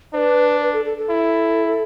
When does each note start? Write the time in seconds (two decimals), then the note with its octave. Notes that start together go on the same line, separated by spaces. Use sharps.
0.13 D4 C5
0.18 B4
0.61 B4
0.73 A4
0.85 A4
0.97 A4
1.09 E4